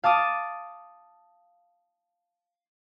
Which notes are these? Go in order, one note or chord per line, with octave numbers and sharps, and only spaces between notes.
F5 A5 D6 D#6